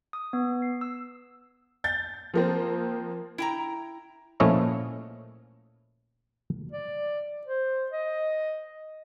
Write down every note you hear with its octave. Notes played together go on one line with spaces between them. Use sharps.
D#6
B3
C7
E6
G6 A6
F3 A#3 C4
E4 G5 A#5
A#2 F3 A3 C#4 E4 D#5
D5
C5
D#5